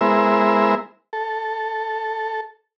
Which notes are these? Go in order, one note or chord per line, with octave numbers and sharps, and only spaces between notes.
G#3 B3 E4 A#4 C5 E5
A4